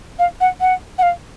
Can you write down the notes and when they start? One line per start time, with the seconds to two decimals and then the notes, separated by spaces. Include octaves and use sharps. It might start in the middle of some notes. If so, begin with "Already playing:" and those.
0.19 F5
0.41 F#5
0.61 F#5
0.98 F#5
1.03 F5